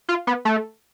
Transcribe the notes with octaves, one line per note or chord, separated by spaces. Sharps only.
F4
B3
A3